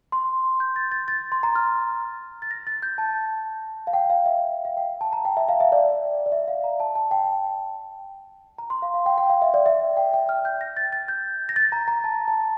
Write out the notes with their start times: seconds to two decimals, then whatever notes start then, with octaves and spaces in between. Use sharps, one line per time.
0.12 C6
0.60 G6
0.76 A6
0.91 A6
1.08 A6
1.32 C6
1.43 A#5
1.55 F6
2.42 A6
2.51 A#6
2.67 A6
2.82 G6
2.98 A5
3.87 F5
3.93 G5
4.10 F5
4.26 E5
4.65 F5
4.77 G5
5.01 A5
5.13 A#5
5.25 G5
5.37 E5
5.49 F5
5.60 E5
5.72 D5
6.26 D5
6.32 E5
6.48 F5
6.64 A#5
6.80 A5
6.95 A5
7.11 G5
8.58 A#5
8.70 C6
8.82 F5
8.94 F5
9.06 G5
9.18 G5
9.30 F5
9.42 E5
9.54 D5
9.66 E5
9.97 G5
10.13 G5
10.29 F6
10.45 G6
10.61 A#6
10.77 A6
10.93 A6
11.08 G6
11.49 A#6
11.56 A6
11.72 A#5
11.88 A#5
12.04 A5
12.28 A5